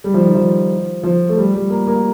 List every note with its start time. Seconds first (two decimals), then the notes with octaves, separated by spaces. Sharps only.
0.04 G3
0.14 F3
0.25 D#3
0.34 F3
1.03 F3
1.29 A3
1.37 G3
1.54 G3
1.70 A#3
1.87 A#3